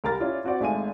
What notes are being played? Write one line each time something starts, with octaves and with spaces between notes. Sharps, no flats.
C2 A#4 A#5 A6
C#4 E4 F4 D5
C4 F#4 C5 D5 F#5
G#1 G#3 A3 F5 G#5 D#7